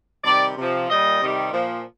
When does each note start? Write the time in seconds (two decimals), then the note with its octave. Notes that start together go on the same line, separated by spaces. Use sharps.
0.24 C3 D#3 G3 D5
0.56 C3 F3
0.89 A#2 G3 D#5
1.21 C3 D#3 G3
1.52 A#2 F3